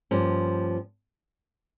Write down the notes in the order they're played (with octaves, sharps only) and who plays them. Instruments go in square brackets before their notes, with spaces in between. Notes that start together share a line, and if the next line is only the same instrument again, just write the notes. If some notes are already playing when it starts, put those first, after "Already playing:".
[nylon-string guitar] G2 F3 A#3 C#4